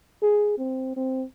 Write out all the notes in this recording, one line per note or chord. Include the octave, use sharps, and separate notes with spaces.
G#4
C4
C4